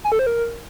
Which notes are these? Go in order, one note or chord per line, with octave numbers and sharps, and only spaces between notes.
G#5
A4
C5
A#4